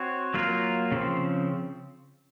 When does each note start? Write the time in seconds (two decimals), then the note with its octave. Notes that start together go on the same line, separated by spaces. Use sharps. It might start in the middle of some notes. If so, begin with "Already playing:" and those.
Already playing: C4 F#4 C#5
0.34 F#3 A#3 F4 A#4
0.92 C#3 F3 C4